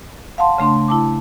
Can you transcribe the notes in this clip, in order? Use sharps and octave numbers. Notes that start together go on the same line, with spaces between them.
F5 F#5 A5 C6
C#3 A3 D4 C6
E4 A5 D6